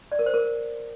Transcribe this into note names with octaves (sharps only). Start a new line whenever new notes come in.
D5
A#4
C5
A#4